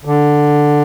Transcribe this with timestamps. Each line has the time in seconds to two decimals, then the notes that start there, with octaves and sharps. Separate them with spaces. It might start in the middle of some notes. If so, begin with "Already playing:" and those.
0.05 D3